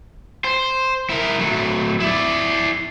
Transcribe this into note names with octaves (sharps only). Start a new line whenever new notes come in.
C5
E4 A#4
F#3 A3
E4 D5